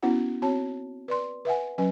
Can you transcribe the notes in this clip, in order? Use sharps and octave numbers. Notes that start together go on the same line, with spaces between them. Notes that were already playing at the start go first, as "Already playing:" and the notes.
B3 C#4 E4 F#4 F#5
C4 F#4 C#5 A5
B4 D5 C6
B4 E5 F#5 G#5
F#3 C#4 B4 G#5